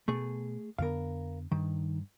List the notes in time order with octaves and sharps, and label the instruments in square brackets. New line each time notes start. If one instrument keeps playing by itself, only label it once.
[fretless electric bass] B2 [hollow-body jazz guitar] A3 G#4
[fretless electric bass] F2 D3 B3 [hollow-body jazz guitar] A#4 F5
[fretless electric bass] G2 [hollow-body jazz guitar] D#3